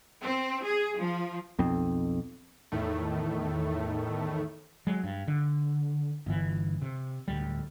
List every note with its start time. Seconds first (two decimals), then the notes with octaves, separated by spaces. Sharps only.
0.21 C4
0.64 G#4
0.99 F3
1.58 B1 F2 C4
2.72 E2 A2 D#3 A3
4.87 F#3 G#3
5.04 G2
5.28 D3
6.26 G1 E3
6.82 C3
7.28 D1 D2 G3